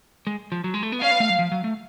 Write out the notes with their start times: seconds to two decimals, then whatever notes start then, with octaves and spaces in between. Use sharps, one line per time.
0.27 G#3
0.52 F3
0.64 F#3
0.74 G#3
0.83 A3
0.92 B3
1.02 C#4 F5
1.11 B3
1.20 A3
1.30 F#3
1.39 F3
1.52 F#3
1.64 A3